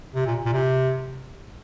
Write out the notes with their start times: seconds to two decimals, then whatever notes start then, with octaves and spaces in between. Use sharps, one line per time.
0.15 C3
0.27 A#2
0.46 A#2
0.53 C3